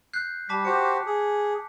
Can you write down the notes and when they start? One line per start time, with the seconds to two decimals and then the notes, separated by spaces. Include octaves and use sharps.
0.13 F#6 G6 C7
0.49 G3 A5 D6 B6
0.65 F#4 G4 C5 C#7
1.06 G#4